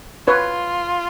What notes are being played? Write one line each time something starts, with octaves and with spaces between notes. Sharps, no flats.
F4 B4 C#5